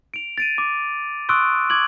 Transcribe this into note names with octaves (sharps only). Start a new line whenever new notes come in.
D7 F7
A6 D7 D#7
D6
C6 C#6 D#6 E6 F#6 D7
D6 G#6 F#7